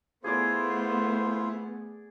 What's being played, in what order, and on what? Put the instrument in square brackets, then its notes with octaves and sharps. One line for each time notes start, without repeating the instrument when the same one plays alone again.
[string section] A3 B3 [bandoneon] E4 F4 [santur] G#4 D5 [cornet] C5